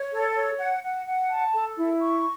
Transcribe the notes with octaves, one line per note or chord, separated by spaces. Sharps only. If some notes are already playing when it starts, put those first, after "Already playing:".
Already playing: C#5
A4
C#5
F#5
F#5
F#5
A5
A4
E4
C#6